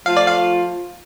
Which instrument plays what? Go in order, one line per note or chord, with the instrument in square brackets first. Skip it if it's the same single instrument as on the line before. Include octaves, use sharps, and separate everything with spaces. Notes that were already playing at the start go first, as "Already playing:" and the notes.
[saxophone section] F3 A3 F4 [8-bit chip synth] F5
[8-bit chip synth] D5
F5